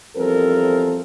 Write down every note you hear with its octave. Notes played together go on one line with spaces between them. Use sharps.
E2 F3 G3 C4 A4 A#4